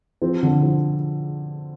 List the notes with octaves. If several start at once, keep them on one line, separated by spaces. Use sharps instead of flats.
F3 C4
D3
F3